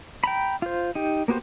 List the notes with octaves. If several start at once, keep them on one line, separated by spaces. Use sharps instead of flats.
G5 A#5 B5
F4 C5
D#4 G4
A#3 B3 F#4 G4 C5